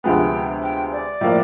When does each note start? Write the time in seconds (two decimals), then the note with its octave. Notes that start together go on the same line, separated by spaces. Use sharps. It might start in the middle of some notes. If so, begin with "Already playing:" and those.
0.04 D2 C3 F3 G#3 B3 G5
0.62 G5
0.92 D5
1.21 A2 F3 A#3